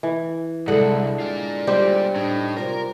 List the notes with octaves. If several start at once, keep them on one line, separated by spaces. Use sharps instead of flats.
E3
C2 F2 D3 G#3 E4 A4 F#5
F4 D5
G3 G4 C5
A2 D4 D#4
C3 F4 A#4 D5